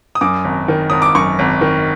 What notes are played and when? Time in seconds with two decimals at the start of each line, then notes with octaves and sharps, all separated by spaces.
0.15 D#6
0.21 F#2 D6
0.44 G#1
0.68 D#3
0.90 G#1 D#6
1.02 D6
1.15 F#2 C#6
1.39 G#1
1.61 D#3